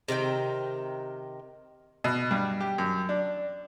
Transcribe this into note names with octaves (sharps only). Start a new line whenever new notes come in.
C3 D#3 A#4 G5
B2
G2
G4
F#2
D4